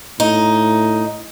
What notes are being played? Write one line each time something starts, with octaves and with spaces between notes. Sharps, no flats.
A2 D#4